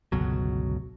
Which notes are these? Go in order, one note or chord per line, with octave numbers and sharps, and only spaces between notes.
G1 C#2 B2 F#3